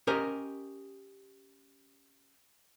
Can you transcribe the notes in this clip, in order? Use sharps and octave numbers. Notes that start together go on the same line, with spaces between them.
C#4 G4 A#4 C5 D#5